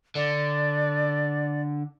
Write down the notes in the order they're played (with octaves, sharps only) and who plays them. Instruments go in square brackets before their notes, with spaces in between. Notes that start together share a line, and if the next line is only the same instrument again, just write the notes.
[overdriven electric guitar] D3 [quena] D5